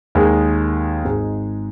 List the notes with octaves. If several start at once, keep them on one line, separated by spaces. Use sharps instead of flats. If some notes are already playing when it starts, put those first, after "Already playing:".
D#2 D#3 G#3 D#4 G#4
G#1 G#2 G#3 D#4 G#4